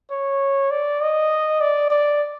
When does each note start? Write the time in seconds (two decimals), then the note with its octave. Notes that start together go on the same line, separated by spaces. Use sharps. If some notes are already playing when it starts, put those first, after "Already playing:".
0.11 C#5
0.71 D5
1.01 D#5
1.61 D5
1.90 D5